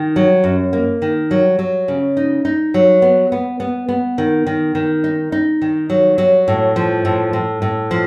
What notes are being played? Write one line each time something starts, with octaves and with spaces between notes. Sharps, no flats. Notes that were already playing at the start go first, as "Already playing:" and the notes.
Already playing: D#3
F#3
F#2
A#3
D#3
F#3
F#3
C#3
D#4
D#4
F#3
B3
B3
B3
B3
D#3
D#3
D#3
D#4
D#4
D#3
F#3
F#3
A2
F3
A2
A2
A2
F3